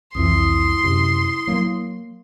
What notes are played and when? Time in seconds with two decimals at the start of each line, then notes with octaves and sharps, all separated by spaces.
0.15 C2 F2 E3 E4 C6 D#6
0.84 F#2 C3
1.47 F#3 A#3